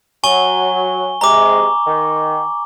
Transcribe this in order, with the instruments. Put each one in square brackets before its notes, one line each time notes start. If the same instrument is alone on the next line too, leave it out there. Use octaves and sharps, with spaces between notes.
[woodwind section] F#3 [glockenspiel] G#5 C#6 G7
[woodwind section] C3 G#3 [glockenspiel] A#5 D6
[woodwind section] D#3